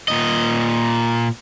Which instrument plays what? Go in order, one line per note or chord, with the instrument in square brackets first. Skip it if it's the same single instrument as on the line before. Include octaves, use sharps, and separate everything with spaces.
[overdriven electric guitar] A#2 D#5